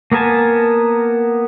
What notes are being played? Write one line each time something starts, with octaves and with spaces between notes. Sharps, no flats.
A#3 B3 A#4 G#5 A5